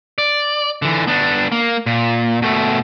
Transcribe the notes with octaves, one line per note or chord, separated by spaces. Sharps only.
D5
D3 E3
B3 D4
A#3
A#2
B2 A3